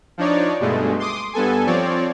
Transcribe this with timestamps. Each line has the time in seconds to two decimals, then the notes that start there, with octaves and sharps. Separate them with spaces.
0.18 F3 D4 D#4 C#5 D5
0.60 G2 B2 G#3 A3
0.99 C6 D6 D#6
1.33 G2 B3 A4 G#5
1.67 F3 C4 C#5 D5